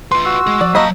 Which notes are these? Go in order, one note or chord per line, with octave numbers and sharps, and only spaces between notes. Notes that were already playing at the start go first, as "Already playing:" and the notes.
F4 B4 C6
F#4 E6
G#3 G#4
F3 D5
F#3 A#3 D#5 A5 B5